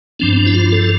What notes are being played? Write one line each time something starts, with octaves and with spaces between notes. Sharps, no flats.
G2 F3 C4 D4
C4
D4
E4
F4
A4